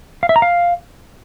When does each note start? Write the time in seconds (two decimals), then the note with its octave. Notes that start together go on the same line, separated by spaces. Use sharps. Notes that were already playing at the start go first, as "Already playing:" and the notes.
0.23 F5
0.29 E5
0.36 A#5
0.42 F5